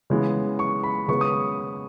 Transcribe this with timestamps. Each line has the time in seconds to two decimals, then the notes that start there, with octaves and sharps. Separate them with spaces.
0.10 C#3 E3 G#3 B3
0.59 C#6
0.83 B5
1.08 C#3 G#3 B3 C#6
1.21 D#6
1.32 C#6